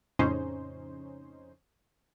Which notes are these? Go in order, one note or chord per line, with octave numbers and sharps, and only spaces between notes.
F2 A2 C#3 C#4 D#4 C5